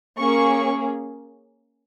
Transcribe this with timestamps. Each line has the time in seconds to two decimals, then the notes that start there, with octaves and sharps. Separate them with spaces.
0.18 A#3 C#4 G#4 C#6